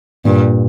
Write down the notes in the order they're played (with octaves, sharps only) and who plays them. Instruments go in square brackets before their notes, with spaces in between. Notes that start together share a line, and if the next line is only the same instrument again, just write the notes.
[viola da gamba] G2 [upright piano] A#2